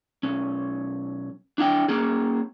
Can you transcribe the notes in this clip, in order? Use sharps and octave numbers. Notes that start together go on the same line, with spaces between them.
B1 C#4
D4 E4 F5 G5
A#3 C#4 G#4